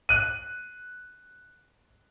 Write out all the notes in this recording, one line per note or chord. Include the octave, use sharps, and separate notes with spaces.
F#6 D#7